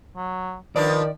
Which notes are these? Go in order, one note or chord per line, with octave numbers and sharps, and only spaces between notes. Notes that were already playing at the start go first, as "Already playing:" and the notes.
F#3
D#3 F3 D4 D#4 B4 D5